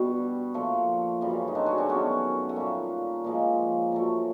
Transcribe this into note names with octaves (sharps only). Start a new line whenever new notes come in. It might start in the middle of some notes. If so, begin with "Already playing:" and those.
Already playing: B2 G3 D4
A#2 F3 A3
F#2 C#3 E3 G3
D#4
C4 D4
F#4 G#4
C4 D4
F#2 D#3 F#3 A3 B3 C#4
A3
A#2 G3 A#3
A#2 F3 G#3 A#3
A#2 F#3 A3